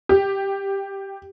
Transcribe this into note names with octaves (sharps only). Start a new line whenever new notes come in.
G4